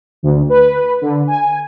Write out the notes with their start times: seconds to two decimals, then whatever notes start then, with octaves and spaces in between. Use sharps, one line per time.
0.23 D2
0.49 B4
1.02 D3
1.27 G#5